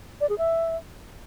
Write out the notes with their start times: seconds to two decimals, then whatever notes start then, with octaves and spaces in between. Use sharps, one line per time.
0.21 D5
0.29 G#4
0.38 E5